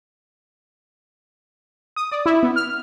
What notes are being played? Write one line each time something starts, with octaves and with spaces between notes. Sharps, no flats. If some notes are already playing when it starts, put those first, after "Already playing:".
D#6
D5
E4
B3
F6